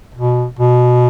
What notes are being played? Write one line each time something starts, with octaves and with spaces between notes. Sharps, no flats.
B2
B2